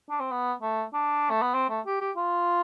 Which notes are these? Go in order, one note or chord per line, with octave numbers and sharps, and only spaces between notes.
D4
C4
B3
A3
D4
A3
B3
C4
A3
G4
G4
F4